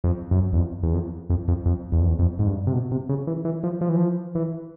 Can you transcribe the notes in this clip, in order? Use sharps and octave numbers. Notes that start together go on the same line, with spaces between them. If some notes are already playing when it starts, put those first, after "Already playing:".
F2
F#2
E2
F2
E2
F2
F2
F2
F2
E2
F2
E2
F2
G#2
G2
C3
B2
C3
C#3
E3
E3
F3
F3
E3
F3
E3